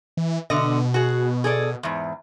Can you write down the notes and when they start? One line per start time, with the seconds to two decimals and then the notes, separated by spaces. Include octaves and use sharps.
0.17 E3
0.50 B2 D3 D#5
0.94 F#4 G#4
1.44 G#4 A4 D5
1.83 E2 G#2